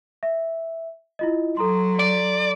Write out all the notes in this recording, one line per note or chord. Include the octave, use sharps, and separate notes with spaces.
E5
E4 F4 D#5
F#3 A4 A#5 C6
D5